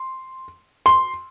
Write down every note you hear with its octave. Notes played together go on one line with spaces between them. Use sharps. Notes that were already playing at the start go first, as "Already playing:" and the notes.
Already playing: C6
C6